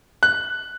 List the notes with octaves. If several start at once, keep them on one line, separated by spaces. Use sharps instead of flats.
F#6